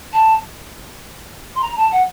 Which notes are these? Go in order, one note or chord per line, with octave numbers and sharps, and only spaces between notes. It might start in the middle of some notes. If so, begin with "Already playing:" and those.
A5
C6
A#5
A5
F#5